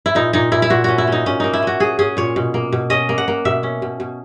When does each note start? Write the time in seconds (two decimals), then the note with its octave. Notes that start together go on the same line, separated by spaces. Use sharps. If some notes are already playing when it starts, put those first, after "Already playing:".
0.06 E4
0.15 A#2 D#4
0.33 A#2 D#4
0.52 A#2 E4
0.62 E4
0.70 A#2 F#4
0.84 C#4 F#4
0.98 E4
1.07 C#4 D#4
1.26 A#2 C#4
1.40 A#3 D#4
1.53 E4
1.63 C#4 F#4
1.80 C#4 G#4
1.99 C#4 G#4
2.17 A#2 C#5
2.36 B2
2.54 A#3
2.73 B2
2.90 C#4 D#5
3.09 A#3
3.18 F#5
3.28 A#3
3.45 B2 E5
3.63 C#4
3.82 B2
4.00 B2